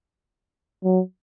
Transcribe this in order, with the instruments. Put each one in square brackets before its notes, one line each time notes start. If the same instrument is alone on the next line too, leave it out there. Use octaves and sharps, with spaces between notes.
[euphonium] F#3